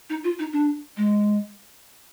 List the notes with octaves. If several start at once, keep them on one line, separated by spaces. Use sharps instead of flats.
D#4
F4
D#4
D4
G#3